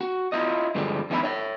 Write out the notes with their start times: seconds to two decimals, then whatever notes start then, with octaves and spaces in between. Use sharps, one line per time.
0.01 F#4
0.32 E4 F4 D#5
0.75 G2 D3 F3 G3 G#3
1.10 E2 G3 D#4 E5 G5 B5
1.23 C#5 E5